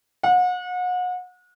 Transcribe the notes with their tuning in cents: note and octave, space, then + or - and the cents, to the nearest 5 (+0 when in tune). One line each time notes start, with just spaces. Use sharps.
F#5 -35